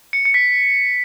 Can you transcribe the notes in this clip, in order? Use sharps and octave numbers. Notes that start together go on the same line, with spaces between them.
C#7
C#7
B6